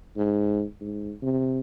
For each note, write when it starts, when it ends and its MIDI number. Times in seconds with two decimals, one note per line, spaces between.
0.17 0.63 44
0.81 1.14 44
1.22 1.60 48